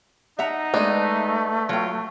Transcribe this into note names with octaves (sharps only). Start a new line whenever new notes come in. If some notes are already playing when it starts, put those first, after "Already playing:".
D#4 E5 F#5 A#5
G#3 A3 B3 D4 D#5
F#3 F4 G5